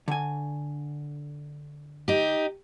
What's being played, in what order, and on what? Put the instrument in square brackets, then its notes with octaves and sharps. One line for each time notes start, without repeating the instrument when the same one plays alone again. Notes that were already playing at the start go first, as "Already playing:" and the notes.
[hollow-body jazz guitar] D3 G#5
[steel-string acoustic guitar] D#4 G4